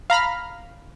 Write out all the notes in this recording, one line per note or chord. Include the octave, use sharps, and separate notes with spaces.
F5 A#5 B5 F6